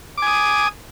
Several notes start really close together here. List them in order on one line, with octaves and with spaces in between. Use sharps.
D6 G#5 D#6